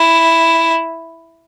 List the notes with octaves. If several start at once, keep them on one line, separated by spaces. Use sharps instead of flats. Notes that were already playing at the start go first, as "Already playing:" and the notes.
Already playing: E4